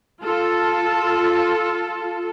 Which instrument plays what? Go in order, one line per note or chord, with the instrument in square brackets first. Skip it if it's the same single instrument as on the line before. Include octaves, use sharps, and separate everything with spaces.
[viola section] F4 A4